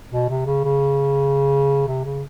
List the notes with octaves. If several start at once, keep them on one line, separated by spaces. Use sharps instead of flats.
B2
C3
C#3
C#3
C3
C#3